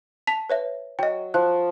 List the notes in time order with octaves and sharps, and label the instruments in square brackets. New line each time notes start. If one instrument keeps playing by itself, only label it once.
[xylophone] A5 B6 F7
B4 C#5 E5
[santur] F#3 [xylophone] D#5 G5
[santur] F3 [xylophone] F#6